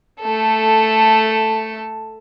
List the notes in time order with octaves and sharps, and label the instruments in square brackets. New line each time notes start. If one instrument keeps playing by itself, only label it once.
[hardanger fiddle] A3 A4